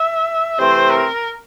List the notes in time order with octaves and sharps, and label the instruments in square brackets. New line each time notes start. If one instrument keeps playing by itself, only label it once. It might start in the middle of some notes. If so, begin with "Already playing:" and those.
Already playing: [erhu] E5
[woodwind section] C3 E3 A3 C4 [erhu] C5
[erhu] A#4